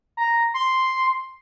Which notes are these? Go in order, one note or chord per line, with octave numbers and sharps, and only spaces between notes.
A#5
C6